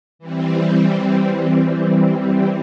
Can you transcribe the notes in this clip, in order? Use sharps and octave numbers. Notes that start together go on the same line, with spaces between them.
E3 G3 C4